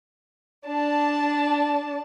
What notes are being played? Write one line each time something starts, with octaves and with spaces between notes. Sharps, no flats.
D4 A5